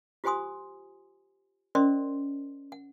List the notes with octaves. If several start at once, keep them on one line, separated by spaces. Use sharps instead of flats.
F4 G4 C5 G#5 C6 D#6
C#4 A#4 C5 D5 D#5 C6
F#5